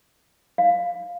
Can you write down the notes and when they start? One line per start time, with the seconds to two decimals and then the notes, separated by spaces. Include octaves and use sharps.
0.58 F5